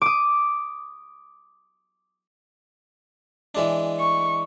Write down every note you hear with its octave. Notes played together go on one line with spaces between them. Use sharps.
D6 D#6
E3 G#3 D4
C#6